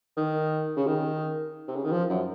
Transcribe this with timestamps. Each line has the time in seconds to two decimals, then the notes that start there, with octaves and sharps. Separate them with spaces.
0.17 D#3
0.76 C#3
0.87 D#3
1.67 C3
1.76 C#3
1.84 D#3
1.92 F3
2.09 F#2